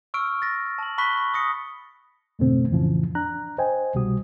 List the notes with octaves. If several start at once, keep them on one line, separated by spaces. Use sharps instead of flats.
C#6 E6 F6 D7
A6 A#6
A5 F#7
A5 B5 C#6 F#6 B6 G7
D#6 A#6 C#7
F2 G#2 B2 D3 A3 C4
F2 A2 C#3 E3 F3
D4 A#5 F#6
C5 D#5 G5 G#5
C2 B2 G3 F#4 D#6